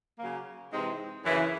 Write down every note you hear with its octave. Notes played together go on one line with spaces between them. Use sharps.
C#3 F#3 A#3
C3 E3 G#3 C4 D#4
F#2 C#3 E3